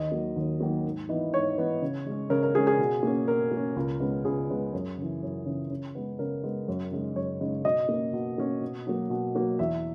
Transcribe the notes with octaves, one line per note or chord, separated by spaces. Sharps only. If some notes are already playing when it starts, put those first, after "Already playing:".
Already playing: D#2 D#5
D#3 F#3 A#3
D#2
D#3 F#3 A#3
G#2
E3 B3 D#4
G#2 C#5
E3 B3 D#4
C#3
G#3 C#4
C#3 A#4
A#4
G#3 C#4 G#4
G#4
B2
A#3 C#4
B2 A#4
A#3
C#4
C#2
C#3 G#3 B3
C#2 G#4
C#3 G#3 B3
F#2
C#3 E3
F#2
C#3 E3
C#3
G#3 B3
C#3 A#4
G#3 B3
F#2
C#3 G#3 D#4
F#2 C#5
C#3 G#3 D#4
B2 D#5
A#3 C#4
B2
A#3 C#4
B2
F#3 A#3
B2
F#3 A#3
E2 E5